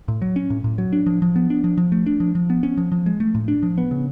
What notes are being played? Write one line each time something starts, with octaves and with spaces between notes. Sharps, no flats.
A2
F#3
C#4
A2
A2
F#3
D4
F3
F3
B3
D4
F3
F3
A3
D4
F3
F3
B3
C#4
F3
F3
G#3
A3
A2
D4
F3
B3
C#3